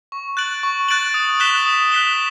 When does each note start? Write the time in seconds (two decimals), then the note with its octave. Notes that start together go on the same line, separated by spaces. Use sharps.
0.12 C#6
0.37 F#6 A6 D7 F#7
0.63 C#6
0.88 F#6 A6 D7 F#7
1.14 D#6
1.40 F#6 B6 E7 G7
1.66 D#6
1.92 F#6 B6 E7 G7